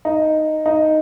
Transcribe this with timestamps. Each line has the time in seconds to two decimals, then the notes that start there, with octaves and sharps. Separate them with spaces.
0.05 D#4
0.66 D#4